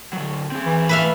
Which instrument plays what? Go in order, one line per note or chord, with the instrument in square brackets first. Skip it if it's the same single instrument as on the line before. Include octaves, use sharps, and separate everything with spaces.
[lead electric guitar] D3 F#3
C4 G#4
[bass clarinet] E3
[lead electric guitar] A2 B5 [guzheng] B4 E5 F5